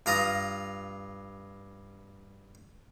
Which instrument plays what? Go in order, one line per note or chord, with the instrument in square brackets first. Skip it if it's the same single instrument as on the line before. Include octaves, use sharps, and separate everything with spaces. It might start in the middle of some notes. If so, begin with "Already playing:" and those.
[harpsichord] G2 F4 A#5 D#6